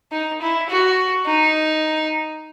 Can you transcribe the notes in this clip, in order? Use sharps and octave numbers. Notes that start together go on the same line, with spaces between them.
D#4
E4
F#4
D#4